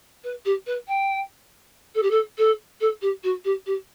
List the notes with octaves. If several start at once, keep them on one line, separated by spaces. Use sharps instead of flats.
B4
G4
B4
G5
A4
G4
A4
A4
A4
G4
F#4
G4
G4